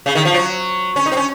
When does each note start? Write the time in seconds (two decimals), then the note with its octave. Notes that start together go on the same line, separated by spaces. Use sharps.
0.06 C#3
0.15 D#3
0.25 F3
0.34 F#3
0.96 C#4
1.06 D#4
1.12 C4
1.17 C#4